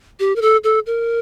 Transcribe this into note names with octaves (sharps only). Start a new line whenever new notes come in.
G4
A#4
A4
A4
A#4